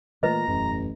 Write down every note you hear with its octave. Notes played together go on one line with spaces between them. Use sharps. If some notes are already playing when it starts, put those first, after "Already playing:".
A#2 E3 F#3 A3 B4 D#5 A#5
E1 A1 F#2